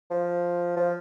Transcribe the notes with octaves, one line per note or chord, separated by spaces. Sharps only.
F3
F3